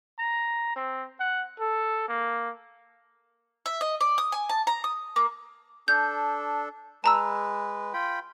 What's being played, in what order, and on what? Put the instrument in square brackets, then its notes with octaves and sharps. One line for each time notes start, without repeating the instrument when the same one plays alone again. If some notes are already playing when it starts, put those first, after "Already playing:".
[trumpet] A#5
C4
F#5
A4
A#3
[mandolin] E5
D#5
D5
D#6
G#5
A5
A#5
D#6
A#3
[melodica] D4 A4 [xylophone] G6
[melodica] G#3 B4 [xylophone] A5 A#5 E6
[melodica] F4 G5 B5